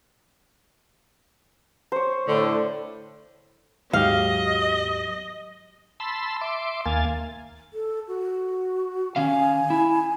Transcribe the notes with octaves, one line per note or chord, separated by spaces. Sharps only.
C5 C#5
A2 D3
D#2 G#2 F#3 G4 D#5 F5
A5 B5 C6 E6
E5 C6 D6
D#2 A#3 F5 G#5 A6
A4
F#4
D#3 C#4 F5 G#5
E4